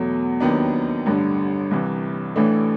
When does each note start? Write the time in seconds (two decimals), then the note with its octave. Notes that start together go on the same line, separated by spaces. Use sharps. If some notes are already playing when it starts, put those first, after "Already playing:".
Already playing: E2 B2 F#3 A3
0.40 D#2 D#3 F#3 B3 D4
1.06 A1 G2 D3
1.71 C2 C3 E3
2.36 A1 A2 E3 A3 D4